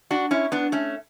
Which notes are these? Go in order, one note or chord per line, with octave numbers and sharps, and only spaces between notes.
D4 F#4
C#4 E4
B3 D4
A3 C#4